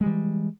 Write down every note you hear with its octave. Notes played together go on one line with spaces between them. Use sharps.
E3 G3 G#3